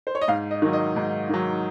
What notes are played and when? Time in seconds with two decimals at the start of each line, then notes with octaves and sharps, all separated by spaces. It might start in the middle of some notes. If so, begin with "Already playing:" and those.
0.07 C5
0.15 C#5
0.21 D#5
0.28 G#2 F5
0.51 D#5
0.62 D#3 F#3
0.73 D#5
0.96 G#2
1.29 D#3 F#3